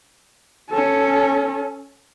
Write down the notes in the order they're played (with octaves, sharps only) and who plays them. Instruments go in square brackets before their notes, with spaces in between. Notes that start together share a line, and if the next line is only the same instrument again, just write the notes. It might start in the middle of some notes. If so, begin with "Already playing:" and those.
[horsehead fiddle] C#4 A4